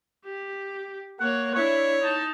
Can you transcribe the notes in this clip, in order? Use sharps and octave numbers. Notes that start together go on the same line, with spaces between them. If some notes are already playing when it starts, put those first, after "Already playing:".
G4
A#3 C#5 F#5
D4 E4 C#5
D#4 A5